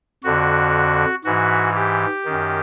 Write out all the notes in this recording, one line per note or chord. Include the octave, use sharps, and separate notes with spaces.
F2 D3 F#4
G#2 E3 F#4
G4
F#2 D#3